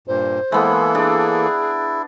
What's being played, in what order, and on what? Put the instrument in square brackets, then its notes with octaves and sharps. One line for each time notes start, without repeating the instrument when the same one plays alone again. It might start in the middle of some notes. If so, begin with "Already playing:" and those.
[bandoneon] G2 A#2 [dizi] C5
[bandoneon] E3 A#3 A4 [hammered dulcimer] G#3 B3 [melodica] E4
[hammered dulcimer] D4 [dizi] G#4